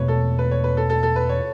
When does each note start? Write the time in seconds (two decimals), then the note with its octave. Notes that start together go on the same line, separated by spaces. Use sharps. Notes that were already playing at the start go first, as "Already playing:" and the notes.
Already playing: E2 B2 A3 B4 C#5
0.08 A4
0.39 B4
0.51 C#5
0.64 B4
0.77 A4
0.90 A4
1.03 A4
1.16 B4
1.29 C#5